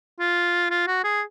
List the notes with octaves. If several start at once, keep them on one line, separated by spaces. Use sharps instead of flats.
F4
F4
F#4
G#4